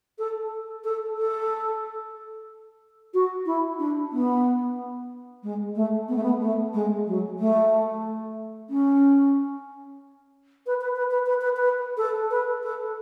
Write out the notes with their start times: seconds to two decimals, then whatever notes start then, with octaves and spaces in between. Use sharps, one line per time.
0.18 A4
0.84 A4
1.17 A4
3.13 F#4
3.46 E4
3.79 D4
4.12 B3
5.43 G#3
5.75 A3
6.08 B3
6.16 A3
6.23 B3
6.41 A3
6.73 G#3
7.07 F#3
7.39 A3
8.69 C#4
10.66 B4
10.81 B4
10.96 B4
11.11 B4
11.26 B4
11.41 B4
11.56 B4
11.97 A4
12.30 B4
12.63 A4